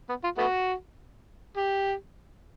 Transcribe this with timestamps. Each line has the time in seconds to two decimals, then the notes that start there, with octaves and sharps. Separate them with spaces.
0.09 B3
0.24 F4
0.38 A3 B3 F#4
1.57 G4